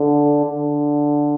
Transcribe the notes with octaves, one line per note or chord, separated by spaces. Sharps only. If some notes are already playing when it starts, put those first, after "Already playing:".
Already playing: D3
D3